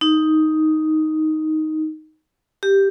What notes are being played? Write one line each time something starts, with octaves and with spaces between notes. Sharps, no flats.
D#4
G4